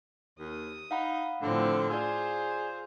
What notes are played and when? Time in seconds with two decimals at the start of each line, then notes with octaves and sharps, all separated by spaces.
0.39 D#2 D#6
0.91 D#4 F5 F#5 B5
1.42 A2 D3 F3 C4
1.90 F4 G#4 C5 D5 E6